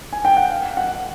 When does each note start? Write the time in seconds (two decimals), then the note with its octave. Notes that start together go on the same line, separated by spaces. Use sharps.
0.13 G#5
0.25 G5
0.37 F#5
0.50 F5
0.77 F#5